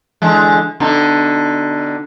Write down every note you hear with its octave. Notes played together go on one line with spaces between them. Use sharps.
D3 E3 G#3
B2 D3 D#4